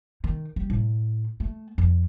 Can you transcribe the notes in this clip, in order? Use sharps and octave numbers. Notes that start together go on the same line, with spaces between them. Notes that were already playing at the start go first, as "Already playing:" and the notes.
D#3
G3
A2
A3
F2